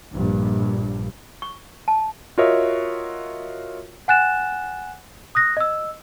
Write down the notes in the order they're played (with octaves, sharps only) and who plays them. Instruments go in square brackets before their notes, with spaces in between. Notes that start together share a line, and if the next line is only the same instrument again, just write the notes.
[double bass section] A#1 G2
[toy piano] C#6
A5
[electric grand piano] F4 F#4 A#4 C#5 D#5 E5
[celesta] F#5 G#5 F#6 A6 E7
D#6 F#6 A#6
D#5 E6